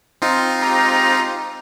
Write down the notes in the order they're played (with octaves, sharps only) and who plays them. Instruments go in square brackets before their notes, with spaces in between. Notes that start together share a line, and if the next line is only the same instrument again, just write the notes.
[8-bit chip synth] C4 D#4 F4
[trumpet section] G#3 G4 A#5